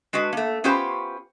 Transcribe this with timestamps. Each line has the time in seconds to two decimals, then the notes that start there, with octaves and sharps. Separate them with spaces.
0.13 G#3 D4 F#4 B4
0.33 A3 A#3
0.64 B3 C#4 F4 G4 B4 C5